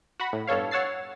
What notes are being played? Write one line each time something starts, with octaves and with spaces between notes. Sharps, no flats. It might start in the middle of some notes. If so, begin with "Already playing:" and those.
F#4 F#5 B5
A2
G1 G2 A4 C#5 F5
C#5 F#5 E6 A6 C7